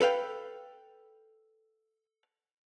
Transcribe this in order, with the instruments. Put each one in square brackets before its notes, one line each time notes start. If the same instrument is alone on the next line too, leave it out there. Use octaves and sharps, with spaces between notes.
[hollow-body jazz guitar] A4 B4 F5 G5